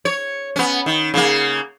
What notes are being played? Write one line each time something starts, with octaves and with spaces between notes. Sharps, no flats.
C#5
B3 C#4
D#3
C#3 A#3